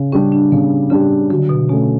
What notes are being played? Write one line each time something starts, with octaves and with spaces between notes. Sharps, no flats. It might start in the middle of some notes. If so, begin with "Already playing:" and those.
Already playing: C#3
G3 C#4 D4 G4
D4
C#3 B3
C#3 G3 D4 G4
D3 F#3
B2
B2 A3 C#4